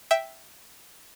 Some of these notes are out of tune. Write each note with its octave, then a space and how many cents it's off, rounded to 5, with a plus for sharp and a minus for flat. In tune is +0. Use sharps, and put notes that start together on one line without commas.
E5 +0 G5 +0